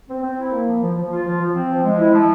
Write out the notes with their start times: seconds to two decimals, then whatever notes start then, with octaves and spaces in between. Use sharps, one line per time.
0.09 C4
0.23 C4
0.38 E4
0.52 A#3
0.67 F3
0.81 F3
0.97 F3
1.12 F4
1.26 F3
1.40 F3
1.55 C4
1.69 F3
1.85 G#3
1.99 E4
2.14 F3